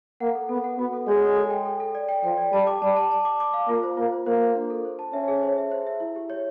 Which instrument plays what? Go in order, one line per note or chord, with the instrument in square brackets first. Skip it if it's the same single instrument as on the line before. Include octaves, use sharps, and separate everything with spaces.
[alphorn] A#3 [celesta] F#5
[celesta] A4
[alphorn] B3 [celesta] A4
[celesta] F#5
[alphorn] B3 [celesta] F#4
[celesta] A4
[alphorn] G#3 [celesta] C#5
[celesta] C#5
A4
G5
A4
A4
D5
G5
[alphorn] F3 [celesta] G5
[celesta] D5
[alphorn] G3 [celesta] A5
[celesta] D6
[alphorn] G3 [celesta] A5
[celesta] A5
A5
D6
D6
F5
[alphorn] A#3 [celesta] F4
[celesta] C5
[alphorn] A#3 [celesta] F4
[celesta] C5
[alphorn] A#3 [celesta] C5
[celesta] C5
D4
A4
C5
A5
[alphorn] C#4 [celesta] E5
[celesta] G#4
C5
E5
C5
E5
E4
G4
C#5